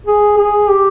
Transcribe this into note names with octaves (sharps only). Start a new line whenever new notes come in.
G#4
G#4
G4